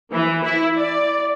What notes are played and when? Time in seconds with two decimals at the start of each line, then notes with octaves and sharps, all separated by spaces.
0.11 E3
0.44 E4
0.77 D5